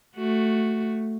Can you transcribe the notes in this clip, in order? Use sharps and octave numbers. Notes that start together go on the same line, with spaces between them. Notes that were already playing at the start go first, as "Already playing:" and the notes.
A3 F#4